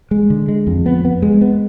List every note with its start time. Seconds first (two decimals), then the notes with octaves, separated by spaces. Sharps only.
0.11 G#3
0.30 D3
0.48 G#3
0.67 F2
0.86 B3
1.05 B3
1.22 G#3
1.41 B3